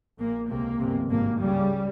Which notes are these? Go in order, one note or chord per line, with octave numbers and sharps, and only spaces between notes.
A#1 A#2 A#3
C#2 C3 A#3
G1 F2 C3
G#1 G2 A#3
C#2 C#3 G3